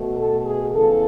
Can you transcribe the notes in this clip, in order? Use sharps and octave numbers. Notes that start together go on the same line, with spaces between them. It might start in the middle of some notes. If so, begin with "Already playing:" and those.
Already playing: B2 A3
A4
G#4
E2 C#3 E3 A4